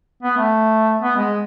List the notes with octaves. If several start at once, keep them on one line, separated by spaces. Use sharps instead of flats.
B3
A3
B3
G#3